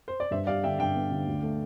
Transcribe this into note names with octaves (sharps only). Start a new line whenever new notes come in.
C5
D5
G2 C5 E5
G3 D5 F5
D3 E5 G5
G2 E5 G5
B3
D3
D2
A3